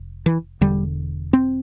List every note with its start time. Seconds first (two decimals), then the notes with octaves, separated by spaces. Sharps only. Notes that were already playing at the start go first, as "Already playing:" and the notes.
Already playing: F1
0.26 E3
0.61 E1 E2 D3 G3
1.33 C4